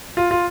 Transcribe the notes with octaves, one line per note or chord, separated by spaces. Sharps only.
F4
F4